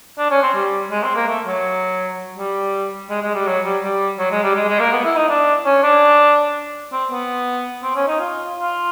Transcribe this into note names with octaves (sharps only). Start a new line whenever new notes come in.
D4
C#4
C4
G3
G#3
C4
A#3
A3
F#3
G3
G#3
G#3
G3
F#3
G3
G3
F#3
G#3
G3
G#3
G#3
A#3
B3
E4
D#4
D4
C#4
D4
C4
B3
C4
C#4
D#4
F4
F4